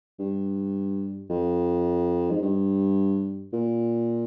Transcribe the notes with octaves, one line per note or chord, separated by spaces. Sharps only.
G2
F2
G#2
G2
A#2